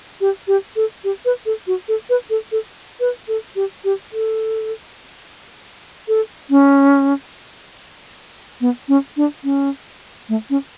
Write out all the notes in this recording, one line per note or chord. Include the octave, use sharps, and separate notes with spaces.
G4
G4
A4
G4
B4
A4
F#4
A4
B4
A4
A4
B4
A4
G4
G4
A4
A4
C#4
B3
C#4
D4
C#4
A3
C#4